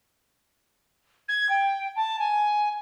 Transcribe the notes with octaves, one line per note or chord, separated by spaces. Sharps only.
G#6
G5
A5
G#5